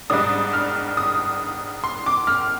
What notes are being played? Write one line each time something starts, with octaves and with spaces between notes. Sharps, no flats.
G#2 G3 D4 D#6
F6
D#6
C6
D6
F6